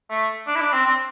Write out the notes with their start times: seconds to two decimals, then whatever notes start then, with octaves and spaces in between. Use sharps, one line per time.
0.10 A3
0.47 D4
0.55 E4
0.61 D4
0.72 C4
0.85 C4